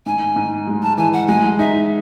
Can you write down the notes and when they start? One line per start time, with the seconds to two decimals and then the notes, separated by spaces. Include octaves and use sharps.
0.06 G#2 G#5
0.36 G#2
0.67 G#3
0.82 A5
0.98 E3 G#5
1.13 F#5
1.28 G#3 G#5
1.59 D#4 E5